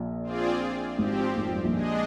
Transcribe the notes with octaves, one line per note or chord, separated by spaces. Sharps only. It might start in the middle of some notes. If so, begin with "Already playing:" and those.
Already playing: A#1 A#2
C4 F4 G#4 D5
G#1 G#2 F3 C4 G4
G#1 G#2
F2
G2
A#1 A#2
G#3 D4 G#4 D#5